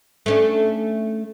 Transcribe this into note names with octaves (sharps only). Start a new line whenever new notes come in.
A3 C#4 D4